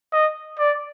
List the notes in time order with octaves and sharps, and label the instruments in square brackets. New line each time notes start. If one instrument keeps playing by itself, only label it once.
[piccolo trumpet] D#5
D5